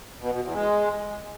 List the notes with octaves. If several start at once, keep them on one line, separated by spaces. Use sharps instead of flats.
B2
B2
E2
G#3